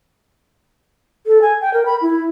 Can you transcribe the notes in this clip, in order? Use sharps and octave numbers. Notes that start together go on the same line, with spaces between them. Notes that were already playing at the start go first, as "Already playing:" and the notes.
A4
G#5
G5
A#4
B5
E4